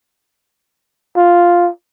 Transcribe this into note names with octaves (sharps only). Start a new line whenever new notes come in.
F4